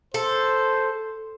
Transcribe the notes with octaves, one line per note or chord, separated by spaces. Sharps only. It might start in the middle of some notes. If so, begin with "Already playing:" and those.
A4 C5